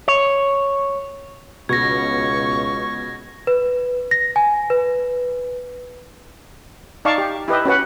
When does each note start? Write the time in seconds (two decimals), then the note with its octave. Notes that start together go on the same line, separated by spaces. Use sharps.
0.08 C#5
1.69 C#2 B2 C#6 G#6 A#6
3.47 B4
4.11 A#6
4.36 G#5
4.70 B4
7.05 D#4 D5 F5 A5 C#6
7.18 G4
7.48 E4 G4 B4 D#5 E5
7.65 C#4 F#4 B4 F#5